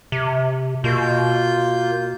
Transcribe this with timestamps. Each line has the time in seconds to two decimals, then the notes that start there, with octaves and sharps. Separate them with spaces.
0.12 C3
0.84 B2 A#3 F4 G6